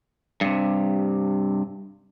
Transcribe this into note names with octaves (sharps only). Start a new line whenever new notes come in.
G2 C3